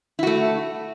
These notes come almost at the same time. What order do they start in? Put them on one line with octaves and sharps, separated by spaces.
E4 F#4 A3